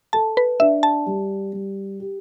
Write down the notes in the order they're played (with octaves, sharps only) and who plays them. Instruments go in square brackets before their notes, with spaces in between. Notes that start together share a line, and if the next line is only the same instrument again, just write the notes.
[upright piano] A4 [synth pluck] A5
[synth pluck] B4
[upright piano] D4 [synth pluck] E5
[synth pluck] A5
[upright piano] G3
G3
G4